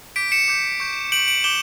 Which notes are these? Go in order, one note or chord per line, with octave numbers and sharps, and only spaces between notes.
D6 G6 B6 D7
C#7 E7
D6 G6
C#6 G6
C#6 G6 D7 F#7
D7 F#7
D6 G6 E7 G7